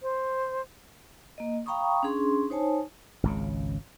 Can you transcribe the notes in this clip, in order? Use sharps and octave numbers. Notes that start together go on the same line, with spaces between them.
C5
A#3 D#5
F5 G5 A#5 B5 C#6 D#6
C#4 D4 G#4 C6
D#4 C5 C#5 G#5 A5
G#1 C#2 C#3